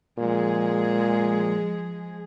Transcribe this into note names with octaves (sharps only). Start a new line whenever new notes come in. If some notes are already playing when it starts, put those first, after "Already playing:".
A#2 F3 G#3 G#4